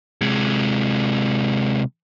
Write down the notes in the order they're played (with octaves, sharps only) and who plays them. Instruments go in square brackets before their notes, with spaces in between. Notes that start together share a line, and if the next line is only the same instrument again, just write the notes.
[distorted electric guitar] C3 G#3